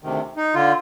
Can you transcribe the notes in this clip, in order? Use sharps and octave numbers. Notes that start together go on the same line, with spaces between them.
D2 C3 D#3
D#4
D3 F4